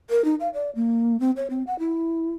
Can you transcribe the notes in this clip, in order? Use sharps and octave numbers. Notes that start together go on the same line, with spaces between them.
A#4
D#4
F5
D5
A#3
C4
C#5
C4
F#5
E4